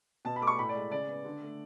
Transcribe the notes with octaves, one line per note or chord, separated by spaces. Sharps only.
B2 A5
B5
A3 D6
C#6
A2 B5
D5
G#3
C#3 D5
B3
D3
A3